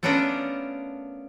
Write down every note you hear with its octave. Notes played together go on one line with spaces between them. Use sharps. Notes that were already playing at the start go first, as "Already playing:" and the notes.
A3 B3 C#4 D4 F4 A#4